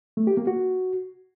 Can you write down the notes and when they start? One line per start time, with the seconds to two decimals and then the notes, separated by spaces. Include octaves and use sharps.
0.17 A3
0.27 G4
0.37 A#3
0.47 F#4